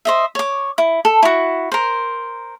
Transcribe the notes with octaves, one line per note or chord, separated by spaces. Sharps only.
C5 D#5 E5
C#5 D6
E4
A4
E4 F#4
A#4 C5